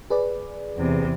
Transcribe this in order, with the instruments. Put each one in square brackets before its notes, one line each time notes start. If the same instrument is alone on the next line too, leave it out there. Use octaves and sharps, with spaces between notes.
[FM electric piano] G#4 B4 D5
[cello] E2 C3